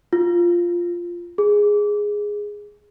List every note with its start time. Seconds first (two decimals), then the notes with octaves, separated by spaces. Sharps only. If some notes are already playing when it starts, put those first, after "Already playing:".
0.13 F4
1.38 G#4